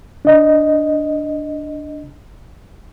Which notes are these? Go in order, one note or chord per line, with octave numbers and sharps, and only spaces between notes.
D4 D#5